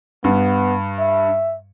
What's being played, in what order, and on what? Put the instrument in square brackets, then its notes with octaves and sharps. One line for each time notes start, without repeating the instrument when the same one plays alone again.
[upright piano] G2 [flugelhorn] B3
[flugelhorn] E5